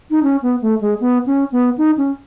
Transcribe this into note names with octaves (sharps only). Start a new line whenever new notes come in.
D#4
C#4
B3
A3
G#3
B3
C#4
B3
D#4
C#4